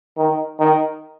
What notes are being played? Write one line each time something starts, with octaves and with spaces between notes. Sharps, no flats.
D#3
D#3